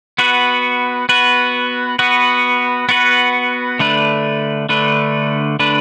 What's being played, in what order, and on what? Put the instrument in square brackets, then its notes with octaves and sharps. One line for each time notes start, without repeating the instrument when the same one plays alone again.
[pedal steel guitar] B3 F#4 B4
B3 F#4 B4
B3 F#4 B4
B3 F#4 B4
D3 A3 D4 B4
D3 A3 D4 B4
D3 A3 D4 B4